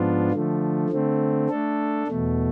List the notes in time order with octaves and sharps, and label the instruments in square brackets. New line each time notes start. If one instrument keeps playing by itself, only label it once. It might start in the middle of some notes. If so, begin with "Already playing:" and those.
Already playing: [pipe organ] G#2 F3 B3 D4 F4
D3 F3 A3
D3 A3 C4
A3 D4 A4
E2 B2 A3